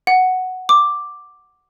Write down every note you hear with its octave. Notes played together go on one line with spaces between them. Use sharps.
F#5
D6